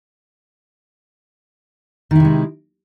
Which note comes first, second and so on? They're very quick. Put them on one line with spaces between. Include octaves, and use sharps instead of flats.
D#3 E4 C3 G#3